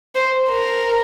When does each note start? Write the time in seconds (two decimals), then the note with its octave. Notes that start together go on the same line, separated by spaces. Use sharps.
0.15 C5
0.50 A#4